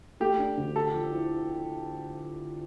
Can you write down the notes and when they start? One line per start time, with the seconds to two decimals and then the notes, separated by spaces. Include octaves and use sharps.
0.20 A3 G4
0.39 D4
0.57 D2
0.75 G4 A4
0.93 F3
1.12 E4